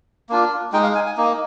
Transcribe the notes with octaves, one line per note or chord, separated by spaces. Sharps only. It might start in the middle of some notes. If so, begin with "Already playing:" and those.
A#3 D4 F4
G#3 D#4 G5
F5
G#5
G#5
A#3 D#4